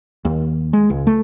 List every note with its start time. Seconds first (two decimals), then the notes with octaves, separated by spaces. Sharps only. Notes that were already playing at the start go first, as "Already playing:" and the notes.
0.25 D#2
0.73 G#3
0.90 C#2
1.07 A3